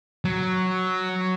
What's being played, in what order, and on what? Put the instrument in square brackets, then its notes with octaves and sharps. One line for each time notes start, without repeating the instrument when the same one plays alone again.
[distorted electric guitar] F#3